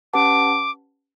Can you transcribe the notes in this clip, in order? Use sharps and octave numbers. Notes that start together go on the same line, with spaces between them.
C#4 G4 B4 F#5 A5 D6